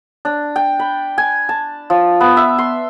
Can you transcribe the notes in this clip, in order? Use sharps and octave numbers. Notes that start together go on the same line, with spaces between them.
D4
G5
B5
G#5
A5
F3
B3
E5
C6